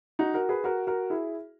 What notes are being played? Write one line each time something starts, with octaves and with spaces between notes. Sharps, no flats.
D#4 F#4
F#4 A#4
G#4 B4
F#4 A#4
F#4 A#4
E4 G#4